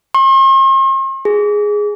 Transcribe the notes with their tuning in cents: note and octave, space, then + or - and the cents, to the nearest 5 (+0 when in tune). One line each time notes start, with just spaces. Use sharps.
C6 +45
G#4 +0